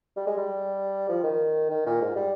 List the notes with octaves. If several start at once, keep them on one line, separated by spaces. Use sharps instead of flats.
G3
G#3
G3
F3
D#3
D#3
A#2
G#2
G3